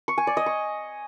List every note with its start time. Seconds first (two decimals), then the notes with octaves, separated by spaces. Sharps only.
0.08 C#6
0.18 G#5
0.27 D5
0.37 D#5
0.46 C#6